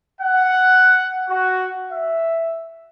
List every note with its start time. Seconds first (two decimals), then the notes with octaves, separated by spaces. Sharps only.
0.21 F#5
1.29 F#4
1.91 E5